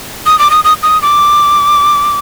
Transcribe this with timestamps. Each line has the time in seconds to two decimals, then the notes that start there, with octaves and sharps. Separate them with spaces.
0.26 D#6
0.39 D6
0.51 D#6
0.64 D#6
0.83 D#6
1.02 D6